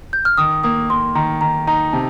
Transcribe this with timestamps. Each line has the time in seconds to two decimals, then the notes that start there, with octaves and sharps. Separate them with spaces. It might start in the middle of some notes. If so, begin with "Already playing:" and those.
0.13 G6
0.25 F6
0.38 D#3 D#6
0.63 A#3 D#6
0.90 A#3 C6
1.15 D#3 A#5
1.41 D#3 A#5
1.67 D#4 A#5
1.93 C3 A5